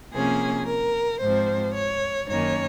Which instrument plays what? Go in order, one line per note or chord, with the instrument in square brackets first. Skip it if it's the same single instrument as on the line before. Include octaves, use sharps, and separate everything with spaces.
[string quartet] C3 F3 A#3 C#4 G#4
A#4
G#2 F3 C4 C5
C#5
F#2 D#3 A#3 C#4 C#5